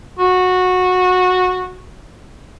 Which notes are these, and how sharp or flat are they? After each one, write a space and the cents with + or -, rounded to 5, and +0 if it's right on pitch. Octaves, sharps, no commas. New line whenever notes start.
F#4 -15